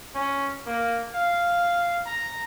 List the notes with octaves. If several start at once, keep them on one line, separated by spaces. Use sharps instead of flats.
C#4
A#3
F5
A#5